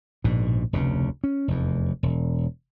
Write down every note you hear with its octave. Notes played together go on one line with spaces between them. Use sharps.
A#1 G#2 B2
F1 D2 C#3
C#4
F1 E2
E1